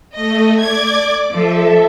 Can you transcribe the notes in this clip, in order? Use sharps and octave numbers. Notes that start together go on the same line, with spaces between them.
A3 D#5
D5 D6 G#6
F3 A4 E5